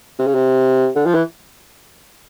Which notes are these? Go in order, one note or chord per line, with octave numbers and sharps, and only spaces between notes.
C3
C#3
C3
D3
F3
E3